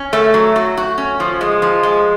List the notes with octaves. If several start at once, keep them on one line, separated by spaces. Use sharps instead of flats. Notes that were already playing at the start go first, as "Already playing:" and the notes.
Already playing: C#4
A3
F#3
F#4
F#4
C#4
F3
G#3
F3
G#3